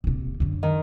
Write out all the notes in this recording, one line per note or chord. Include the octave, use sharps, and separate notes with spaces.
D#1 C3
F#2 D3
D#3